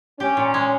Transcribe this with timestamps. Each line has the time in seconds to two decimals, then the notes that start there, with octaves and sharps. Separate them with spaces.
0.20 C#4 G4
0.37 A#2
0.54 G#3